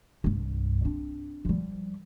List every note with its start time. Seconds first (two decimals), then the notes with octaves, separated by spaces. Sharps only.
0.24 C2 G2
0.85 C4 D4
1.45 F3 G3